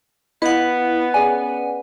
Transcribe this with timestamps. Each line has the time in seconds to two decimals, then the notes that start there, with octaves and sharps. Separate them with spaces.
0.42 B3 E4 B4 D#5 F5 F#5
1.14 C#4 G#4 D5 G#5